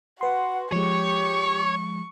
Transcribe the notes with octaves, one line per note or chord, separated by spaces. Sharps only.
F#4 B4 F#5 C6
F3 G#3 G4 C#5 C#6